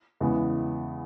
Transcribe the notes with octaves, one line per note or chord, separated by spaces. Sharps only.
E2 C#3 E3 G#3 B3